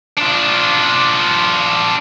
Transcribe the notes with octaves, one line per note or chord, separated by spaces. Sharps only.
D4 F4